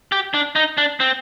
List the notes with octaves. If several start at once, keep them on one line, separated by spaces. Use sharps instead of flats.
G4
D4
D#4
D4
C4